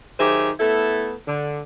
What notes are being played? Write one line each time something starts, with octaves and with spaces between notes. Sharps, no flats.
D#3 F#3 G4 G#4 C5 E5
A3 B3 E4 A4
D3